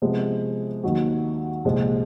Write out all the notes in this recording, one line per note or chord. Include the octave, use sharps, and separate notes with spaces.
C3 F3 G#3 B3
D#2 D#3 F#3
C2 A#2 F3 G#3